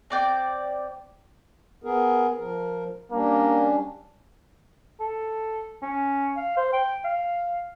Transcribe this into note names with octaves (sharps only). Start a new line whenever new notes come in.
C4 D5 G5
B3 G#4 A#4
F3 A#4
G3 A#3 C#4 D4
A4
C#4
F5
C5
G5
F5